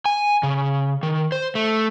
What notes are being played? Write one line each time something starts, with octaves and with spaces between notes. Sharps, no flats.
G#5
C#3
D#3
C5
A3